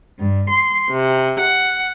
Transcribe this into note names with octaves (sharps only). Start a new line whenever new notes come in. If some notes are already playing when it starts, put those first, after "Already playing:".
G2
C6
C3
F#5